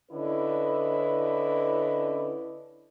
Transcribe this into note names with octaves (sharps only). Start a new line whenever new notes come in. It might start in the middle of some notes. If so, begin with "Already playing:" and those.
D3 C#4 E4 B4 D#5